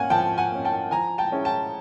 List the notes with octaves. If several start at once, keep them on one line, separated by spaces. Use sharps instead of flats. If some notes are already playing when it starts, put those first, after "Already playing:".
Already playing: A#3 C#4 F#5 G#5
F3 G5 A5
F#5 G#5
A#3 C#4
G5 A5
F3 G#5 A#5
G5 A5
G#3 C#4 E4
G5 A5